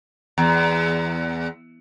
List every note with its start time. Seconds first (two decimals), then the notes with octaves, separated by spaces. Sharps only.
0.38 E2